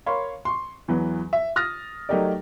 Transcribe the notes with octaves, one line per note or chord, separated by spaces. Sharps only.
A#4 C#5 F5 B5 C6
C6 C#6
E2 E3 F#3 B4
E5
D#6 F6 A6 A#6
F#3 A3 D#4 G4 A#4 D5